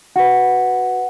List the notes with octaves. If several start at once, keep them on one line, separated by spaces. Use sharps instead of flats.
F#4 B4 F#5